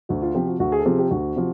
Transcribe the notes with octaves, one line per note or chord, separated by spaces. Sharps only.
D2 F#4
F4
C3 F3 G4
F#4
D2 F#4
G#4
A4
C3 F3 G#4
G4
D2 F#4
C3 F3